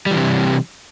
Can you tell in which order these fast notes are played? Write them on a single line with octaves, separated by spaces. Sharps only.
G3 E3 C3